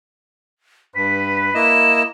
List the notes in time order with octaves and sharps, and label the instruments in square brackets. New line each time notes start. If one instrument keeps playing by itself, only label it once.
[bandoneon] G2 [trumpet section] B4 [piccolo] B6
[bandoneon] A#3 E4 D#5 [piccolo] E7